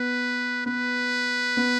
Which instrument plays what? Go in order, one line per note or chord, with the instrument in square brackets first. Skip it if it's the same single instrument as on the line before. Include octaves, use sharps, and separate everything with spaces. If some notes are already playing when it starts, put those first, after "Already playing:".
Already playing: [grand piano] B3 [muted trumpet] B4
[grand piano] B3 [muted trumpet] B4
[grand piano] B3